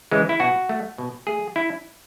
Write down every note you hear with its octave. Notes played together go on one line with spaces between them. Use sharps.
C#3 E3 G#3
E4
B2 F#4
A3
B2
A3 G#4
E4